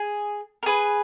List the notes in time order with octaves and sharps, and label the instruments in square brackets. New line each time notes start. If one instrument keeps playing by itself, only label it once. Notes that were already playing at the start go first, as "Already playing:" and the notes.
Already playing: [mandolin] G#4
A#4
G#4 B4